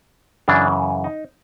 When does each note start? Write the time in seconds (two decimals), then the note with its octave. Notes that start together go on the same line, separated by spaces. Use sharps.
0.48 F#2 C#3 E3 D4
1.04 D#4